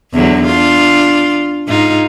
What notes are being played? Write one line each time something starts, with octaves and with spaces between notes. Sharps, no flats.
E2 D3 F#3
D4 F4
G#2 D#4 F4